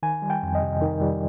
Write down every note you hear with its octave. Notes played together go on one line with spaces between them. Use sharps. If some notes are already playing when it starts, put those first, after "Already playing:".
D#3 G#5
G3
G5
F2
D#5
C3
D#3
G3